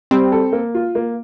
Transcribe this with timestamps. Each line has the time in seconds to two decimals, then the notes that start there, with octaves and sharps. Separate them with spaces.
0.11 G3 C4
0.32 A4
0.52 A#3
0.75 F4
0.95 A#3